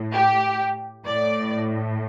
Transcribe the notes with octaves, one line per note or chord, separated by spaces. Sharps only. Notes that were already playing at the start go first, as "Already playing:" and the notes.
Already playing: A2
G4
A2 D5